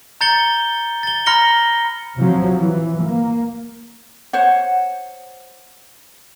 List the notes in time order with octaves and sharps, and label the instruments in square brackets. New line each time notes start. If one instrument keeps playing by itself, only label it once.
[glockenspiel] A#5 G6 A6 C#7 G7
A6 G7
A#5 B5 F6 A#6 C#7 G7
[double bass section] C3 F3 F#3
E3
A#3
[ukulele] C5 C#5 F#5